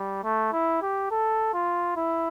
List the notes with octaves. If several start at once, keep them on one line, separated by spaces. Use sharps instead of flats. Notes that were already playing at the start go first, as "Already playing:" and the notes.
Already playing: G3
A3
E4
G4
A4
F4
E4